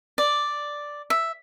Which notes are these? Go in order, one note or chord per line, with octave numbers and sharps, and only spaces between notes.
D5
E5